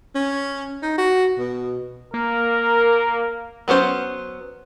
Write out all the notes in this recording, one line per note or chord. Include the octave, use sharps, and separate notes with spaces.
C#4
D#4
F#4
B2
A#3 A#4
F#3 B3 C#4 C5